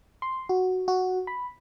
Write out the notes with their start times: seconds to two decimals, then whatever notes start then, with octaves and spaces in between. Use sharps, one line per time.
0.22 C6
0.49 F#4
0.88 F#4
1.27 B5